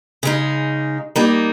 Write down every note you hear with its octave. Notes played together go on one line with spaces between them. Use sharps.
C#3 G#3 D#4
G3 A#3 D#4